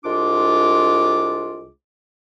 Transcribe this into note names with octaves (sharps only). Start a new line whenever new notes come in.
C2 G#3 D4 F4 D6